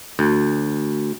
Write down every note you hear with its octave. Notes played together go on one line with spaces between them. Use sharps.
D2